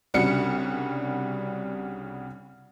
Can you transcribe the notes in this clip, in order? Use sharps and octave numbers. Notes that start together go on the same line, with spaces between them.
C2 C#3 G3 D4 F#4 C#7